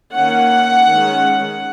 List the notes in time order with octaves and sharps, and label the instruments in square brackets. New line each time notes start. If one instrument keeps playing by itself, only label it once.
[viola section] D#3 A#3 C#4 F#5
D#3 G#3 C#4